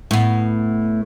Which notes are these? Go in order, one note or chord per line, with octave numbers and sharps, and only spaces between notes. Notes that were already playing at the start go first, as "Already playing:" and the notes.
A2 B3